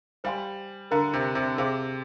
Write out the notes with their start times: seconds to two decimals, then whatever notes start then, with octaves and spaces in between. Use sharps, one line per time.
0.24 G3 C5 F5 G#5 C6
0.91 D3 A#4 F5 A#5
1.14 C3
1.35 C3
1.58 C3 G#4 C5 F5 C6